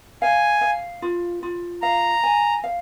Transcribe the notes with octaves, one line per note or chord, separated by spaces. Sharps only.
F5 G#5
F5
F4
F4
F5 A#5
G#5
F5